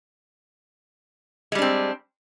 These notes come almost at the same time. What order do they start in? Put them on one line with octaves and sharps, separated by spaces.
G#3 G3 D4 C4